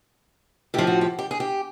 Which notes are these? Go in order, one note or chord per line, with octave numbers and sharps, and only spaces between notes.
A2 F3 G4
F#4
G4
G4
G#4
G4